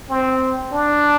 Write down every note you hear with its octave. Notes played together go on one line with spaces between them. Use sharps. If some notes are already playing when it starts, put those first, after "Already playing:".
C4
D4